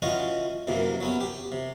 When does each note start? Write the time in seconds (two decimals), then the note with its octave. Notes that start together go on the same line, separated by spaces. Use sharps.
0.02 E3 C#4 F4 F#4 D#5
0.67 F#2 C3 E3 A#3
1.00 F#3 B3 C#4
1.21 G4
1.52 C3